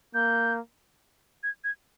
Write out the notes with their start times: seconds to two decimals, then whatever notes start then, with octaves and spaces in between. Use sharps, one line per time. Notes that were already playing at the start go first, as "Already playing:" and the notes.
0.14 A#3 G6
1.43 G#6
1.64 G#6